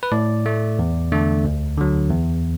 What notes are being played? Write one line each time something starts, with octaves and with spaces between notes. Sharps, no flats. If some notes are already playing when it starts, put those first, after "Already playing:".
B4
A2 D5
A3
E2
D3 A3
D2
D3 F#3
E2